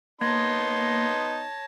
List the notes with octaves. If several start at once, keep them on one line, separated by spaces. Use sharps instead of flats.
A#3 B3 D#4 C#5 A5 C6 G#6 A#6